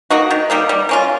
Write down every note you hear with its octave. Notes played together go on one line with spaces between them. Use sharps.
A#3 D#4 F#4
D#3
G3 A#3 D#4
G3
A#3 C#4 F4